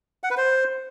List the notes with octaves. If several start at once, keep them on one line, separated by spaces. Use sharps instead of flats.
F#5
B4
C5